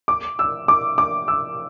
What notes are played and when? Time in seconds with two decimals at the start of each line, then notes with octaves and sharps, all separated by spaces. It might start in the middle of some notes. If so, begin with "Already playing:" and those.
0.08 D6
0.39 E6
0.68 D6
0.98 D6
1.28 E6